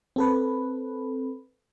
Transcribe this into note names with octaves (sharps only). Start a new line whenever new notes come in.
C4 A4 B4